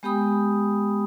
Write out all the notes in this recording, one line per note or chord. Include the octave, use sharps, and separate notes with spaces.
G#3 B3 G4 G5 B5 D#6